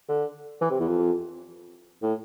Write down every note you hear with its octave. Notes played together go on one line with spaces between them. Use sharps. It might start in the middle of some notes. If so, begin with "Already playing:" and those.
D3
E3
C3
E2
F2
A2